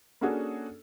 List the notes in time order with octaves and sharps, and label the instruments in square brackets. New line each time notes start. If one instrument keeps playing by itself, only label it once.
[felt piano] A#3 C#4 D4 F#4 G#4 A4